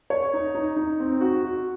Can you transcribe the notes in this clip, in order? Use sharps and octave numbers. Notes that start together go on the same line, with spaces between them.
C#5
D#4
D#4
D#4
C4
F#4
F#4